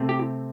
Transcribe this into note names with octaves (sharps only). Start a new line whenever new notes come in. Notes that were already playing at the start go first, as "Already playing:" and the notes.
Already playing: C3 A3 C4
G4